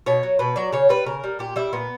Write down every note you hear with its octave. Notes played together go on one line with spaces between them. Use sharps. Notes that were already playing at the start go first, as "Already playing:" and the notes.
B2 C#5
F#3
B2 B4
F#3 D5
C#3 C#5
G3 B4
C#3 A#4
G3
A#2 G4
G3 E4
A#2 B3